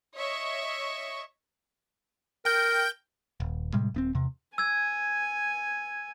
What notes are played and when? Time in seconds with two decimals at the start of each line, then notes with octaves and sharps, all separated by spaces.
0.16 C#5 D#5 E5 C#6
2.45 A#4 G5 G6
3.40 D#1
3.73 A2 C3 G3 G#3
3.94 D#1 B3 C4
4.15 E2 C3
4.58 G#5 E6 G#6